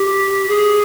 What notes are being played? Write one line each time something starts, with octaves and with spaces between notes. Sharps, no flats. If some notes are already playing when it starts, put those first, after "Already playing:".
Already playing: G4
G#4